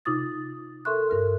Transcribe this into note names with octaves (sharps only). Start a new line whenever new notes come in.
C3 D#4 F4 D6 D#6 A6
A4 A#4 E5 C6 C#6 F#6
G2 A#4 F6